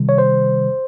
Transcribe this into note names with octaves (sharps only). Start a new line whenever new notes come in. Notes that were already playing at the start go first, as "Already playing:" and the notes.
Already playing: C3 D#3 G3
C#5
C5